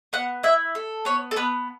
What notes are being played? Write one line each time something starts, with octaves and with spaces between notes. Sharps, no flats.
B3 F#5
E4 E5
A4
B3 C#5
A4
B3 B4